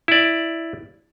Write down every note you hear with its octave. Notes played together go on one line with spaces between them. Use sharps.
E4 D5